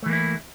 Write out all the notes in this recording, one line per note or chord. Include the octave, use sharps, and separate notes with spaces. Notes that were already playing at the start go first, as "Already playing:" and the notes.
E3 A3 A#3 E4